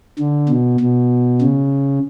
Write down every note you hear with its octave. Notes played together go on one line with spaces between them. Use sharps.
D3
B2
B2
C#3